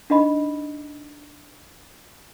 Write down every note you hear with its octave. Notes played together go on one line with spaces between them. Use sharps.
D4 D#4 D#5 B5